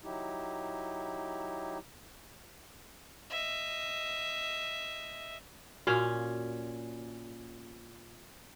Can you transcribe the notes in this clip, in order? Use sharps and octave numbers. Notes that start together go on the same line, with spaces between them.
F#3 D#4 E4 G4
D#5 E5
A#2 C#4 F#4 F5